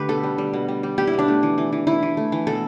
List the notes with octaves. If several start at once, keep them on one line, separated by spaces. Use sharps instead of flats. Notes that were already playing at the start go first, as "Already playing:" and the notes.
Already playing: D3 A3 G4 B4
B2 A4
G3
G3
B2
G3
G3
B2 G4
E4
B2
D4
A3
E3
E3
E3
E3 E4
E3
A3
E3
B2 A4